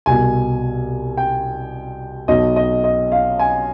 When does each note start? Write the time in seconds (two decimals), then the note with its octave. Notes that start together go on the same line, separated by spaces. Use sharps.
0.06 C2 B2 G#5
1.17 G5
2.28 B1 B2 D#5
2.56 D#5
2.84 D#5
3.12 F5
3.39 G#5